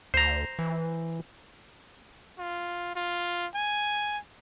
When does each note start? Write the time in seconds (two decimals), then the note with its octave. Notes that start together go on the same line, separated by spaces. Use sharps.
0.14 D2 C5 A#5
0.59 E3
2.38 F4
2.95 F4
3.54 G#5